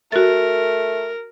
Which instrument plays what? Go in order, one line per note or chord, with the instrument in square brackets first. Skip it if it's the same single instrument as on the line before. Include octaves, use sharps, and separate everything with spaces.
[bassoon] A3 [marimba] F#4 A6 [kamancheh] A#4